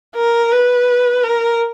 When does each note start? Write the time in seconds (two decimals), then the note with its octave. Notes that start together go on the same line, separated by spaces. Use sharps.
0.16 A#4
0.52 B4
1.23 A#4